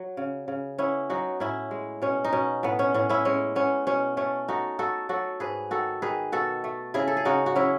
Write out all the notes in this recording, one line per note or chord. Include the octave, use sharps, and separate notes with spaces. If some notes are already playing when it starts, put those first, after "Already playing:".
Already playing: F#3
C#3
C#3
B3 C#4 E4
F#3 D#4 F#4
A2 C#4 E4
G#3
B2 C#4
D#4
B2 C#4
A2 B3
C#4
A2 C#4
C#4 E4
G#3 C#4
B3 C#4
B2 C#4
A3 C#4
A3 D#4 F#4
A3 F#4 A4
F#3 F#4 A4
G#2 G#4 B4
D#3 F#4 A4
D#3 G#4 B4
B2 F#4 A4
A3
C#3 E4 G#4
A4
G#4
C#3 D#4 F#4
F#4
F#3 C#4 E4